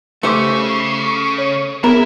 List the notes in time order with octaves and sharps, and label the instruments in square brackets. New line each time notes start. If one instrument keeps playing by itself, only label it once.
[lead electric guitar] C#3 [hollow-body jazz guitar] A3 G4 C5 [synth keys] D6 C#7
[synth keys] C#5
[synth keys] B3 G#4 [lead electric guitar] E4 [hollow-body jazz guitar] A#4